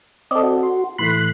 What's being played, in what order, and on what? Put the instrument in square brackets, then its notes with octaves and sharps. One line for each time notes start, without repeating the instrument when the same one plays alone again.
[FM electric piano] C4 A4 [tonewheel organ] D5 D#5
[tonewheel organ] F#4
[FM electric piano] C6
[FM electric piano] A2 E3 A3 [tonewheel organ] B5 C6 F#6